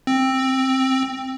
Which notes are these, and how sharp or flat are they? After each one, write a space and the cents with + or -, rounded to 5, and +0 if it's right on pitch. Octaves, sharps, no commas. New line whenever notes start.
C4 +10